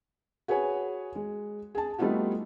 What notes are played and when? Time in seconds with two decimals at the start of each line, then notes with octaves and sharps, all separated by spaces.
0.48 F#4 G#4 B4 C#5 G#5
1.15 G#3
1.75 G#4 A5
1.98 G3 A3 B3 D#4 F4 F#4